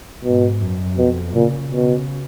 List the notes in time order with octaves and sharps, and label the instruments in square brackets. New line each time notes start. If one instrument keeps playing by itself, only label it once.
[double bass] G#2 [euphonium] B2
[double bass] F#2
[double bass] F2 [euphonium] B2
[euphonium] A#2 [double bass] C#3
[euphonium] B2